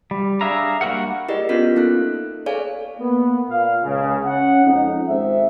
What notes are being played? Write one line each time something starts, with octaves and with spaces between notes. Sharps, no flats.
G3
D4 G#4 E5 F5 A#5
G3 A#3 F#4 A#4 F#5
E4 G4 G#4 A#4 D5 D#5
B3 C#4 F4 A#4 B6
A#3 D#4 A4 F#6
G#4 A4 C#5 D5 F5 G#5
A#3 B3
A#2 F5
C#2 C#3
C#4 F#5
F2 G#2 D#4
G#1 G#2 C4 E5